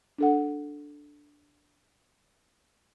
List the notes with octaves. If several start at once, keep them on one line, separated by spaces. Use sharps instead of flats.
D4 A4 F#5